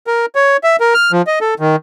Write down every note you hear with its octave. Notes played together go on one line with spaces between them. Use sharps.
A#4
C#5
E5
A#4
F6
F3
D#5
A4
D#3